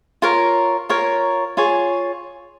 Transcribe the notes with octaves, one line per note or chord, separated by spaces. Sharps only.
F4 A#4 C#5
F4 A#4 C#5
F4 G#4 C#5